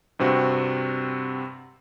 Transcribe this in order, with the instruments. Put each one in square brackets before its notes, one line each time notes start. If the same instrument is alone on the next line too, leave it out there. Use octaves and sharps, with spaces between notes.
[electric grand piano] G2 C3 C4 F#4